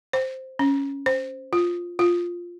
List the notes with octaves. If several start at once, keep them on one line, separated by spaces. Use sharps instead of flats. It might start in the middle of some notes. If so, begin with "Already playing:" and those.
C5
C#4
C5
F4
F4